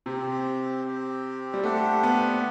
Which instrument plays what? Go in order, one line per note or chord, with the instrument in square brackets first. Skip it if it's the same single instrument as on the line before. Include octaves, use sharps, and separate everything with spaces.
[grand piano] C3 [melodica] C4 G4 C5
[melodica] C4 G4 C5
[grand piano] G3
[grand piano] A3 [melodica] D4 G4 C5 F#5
[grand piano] B3